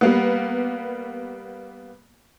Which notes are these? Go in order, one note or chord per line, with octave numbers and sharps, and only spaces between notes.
G3 A#3 B3